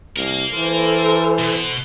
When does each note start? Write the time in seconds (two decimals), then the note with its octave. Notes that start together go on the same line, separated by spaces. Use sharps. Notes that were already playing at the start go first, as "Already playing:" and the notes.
0.16 C2 A#4 F5
0.54 E3 A4 C5
1.39 B2